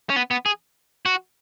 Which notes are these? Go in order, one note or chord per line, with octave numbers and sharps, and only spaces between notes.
C#4
B3
B3
G#4
F#4